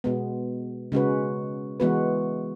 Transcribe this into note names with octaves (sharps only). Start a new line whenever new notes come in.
B2 G#3 B3
C#3 G#3 C#4 F#4 B4
E3 G#3 B3 F#4 B4